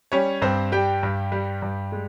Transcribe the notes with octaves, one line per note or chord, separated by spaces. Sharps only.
G3 C#4 C#5
G2 C4 C5
G3 G4 G5
G2
G3
G2
G#3